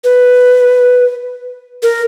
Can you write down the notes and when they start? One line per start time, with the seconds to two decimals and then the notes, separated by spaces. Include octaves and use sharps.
0.04 B4
1.83 A#4